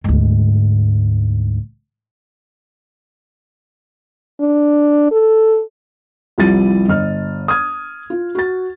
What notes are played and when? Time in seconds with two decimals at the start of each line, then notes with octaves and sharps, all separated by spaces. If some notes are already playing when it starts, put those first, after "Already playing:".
0.04 D2 G#2
4.41 D4
5.11 A4
6.38 C2 F3 G3 E4 A6 D#7
6.88 G1 D#5 F6
7.48 D#6 F6 G#6
8.10 F4
8.35 F#4 A6